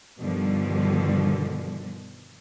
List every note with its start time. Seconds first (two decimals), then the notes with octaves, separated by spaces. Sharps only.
0.19 G2 B2 D3 D#3 F3 G3